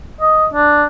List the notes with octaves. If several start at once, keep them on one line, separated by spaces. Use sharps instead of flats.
D#5
D4